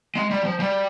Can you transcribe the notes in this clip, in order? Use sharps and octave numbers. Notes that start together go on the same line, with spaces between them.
G#3
G3
F3
G3